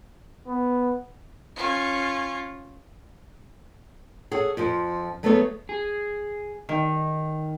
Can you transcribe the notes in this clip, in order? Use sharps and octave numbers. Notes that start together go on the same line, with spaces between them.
B3
C#4 F4
G#4 A4 C#5 F#5
F2 F3 C5
F#3 A3 B3 G#4 A4 C#5
G#4
D#3